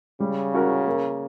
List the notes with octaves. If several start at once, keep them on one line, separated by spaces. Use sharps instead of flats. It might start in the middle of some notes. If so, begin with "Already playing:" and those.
C#3 G3
C#4 F#4 A#4
A#3